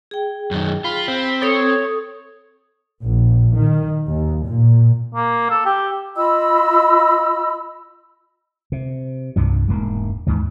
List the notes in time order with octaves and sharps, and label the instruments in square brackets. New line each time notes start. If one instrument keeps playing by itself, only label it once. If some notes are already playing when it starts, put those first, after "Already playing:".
[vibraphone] G#4 G5
[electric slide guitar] F#2 D#3
[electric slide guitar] F4 [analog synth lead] B5
[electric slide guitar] C4
[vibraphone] A4 D#6 [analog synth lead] C#5
[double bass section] A#1
D#3
D#2
A#2
[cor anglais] A#3
A4
G4
[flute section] F4 D#5 B5 E6
[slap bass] C3
C2 G2 F3
E1 G#2 A#3
D#2 G#2 E3